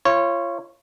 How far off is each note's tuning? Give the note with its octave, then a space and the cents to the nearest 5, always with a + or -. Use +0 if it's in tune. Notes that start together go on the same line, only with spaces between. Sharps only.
F4 -30 C#5 -15